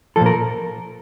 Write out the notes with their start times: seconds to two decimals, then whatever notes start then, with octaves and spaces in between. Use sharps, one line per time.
0.16 A#2 F3 A4
0.26 A#4